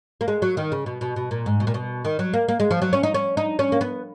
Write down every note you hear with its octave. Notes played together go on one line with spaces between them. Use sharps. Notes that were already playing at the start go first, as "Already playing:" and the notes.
A#3
G#3
F#3
D#3
C#3
B2
B2
B2
A#2
G#2
B2
A#2
B2
D#3
F#3
A#3
A#3
G#3
F3
F#3
C#4
D#4
C#4
D#4
C#4
A#3
B3